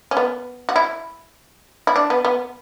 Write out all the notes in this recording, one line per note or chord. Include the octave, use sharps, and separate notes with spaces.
C#4
B3
F#4
E4
E4
D4
B3
B3